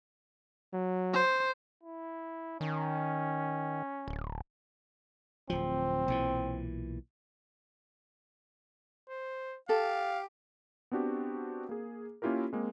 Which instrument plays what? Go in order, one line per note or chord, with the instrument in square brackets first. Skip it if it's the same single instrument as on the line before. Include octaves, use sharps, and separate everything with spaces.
[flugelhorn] F#3
[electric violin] C5
[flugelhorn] E4
[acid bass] D#3 [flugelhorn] C#4
[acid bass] D1
[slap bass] D1 F3 [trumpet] C4
[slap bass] B1 A#2 E3
[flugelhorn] C5
[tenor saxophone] G4 [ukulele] A4 [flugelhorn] F5
[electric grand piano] B3 C4 D4 F#4 G4
A#3 G#4
A#3 C#4 E4 F4 G4 A#4
G#3 A#3 C4